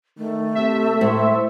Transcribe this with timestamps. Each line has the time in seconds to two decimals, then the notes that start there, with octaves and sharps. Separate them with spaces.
0.18 D#3 A3
0.55 C3 E5
1.01 A2 C5